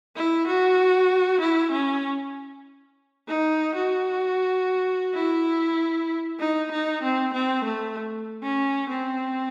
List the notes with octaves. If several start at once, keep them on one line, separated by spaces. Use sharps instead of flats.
E4
F#4
E4
C#4
D#4
F#4
E4
D#4
D#4
C4
C4
A3
C#4
C4